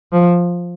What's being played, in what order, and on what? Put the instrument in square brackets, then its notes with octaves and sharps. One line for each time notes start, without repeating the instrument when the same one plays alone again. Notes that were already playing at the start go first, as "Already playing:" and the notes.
[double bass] F3